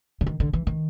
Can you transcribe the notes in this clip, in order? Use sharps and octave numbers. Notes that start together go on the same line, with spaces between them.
D3
D#3
D3
E3
D#3